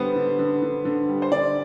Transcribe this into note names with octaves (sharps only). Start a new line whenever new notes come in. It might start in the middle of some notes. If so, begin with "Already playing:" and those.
Already playing: D3 G3 B3 C5
D3
D3
D3
D3
G3
C5
D3 D5